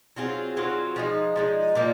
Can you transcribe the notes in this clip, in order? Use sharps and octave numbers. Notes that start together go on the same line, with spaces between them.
F#3 C4 F4 G#4
F#3 C4 F4 G#4
F3 G#3 D#4
F3 G#3 D#4
A#2 F3 A#3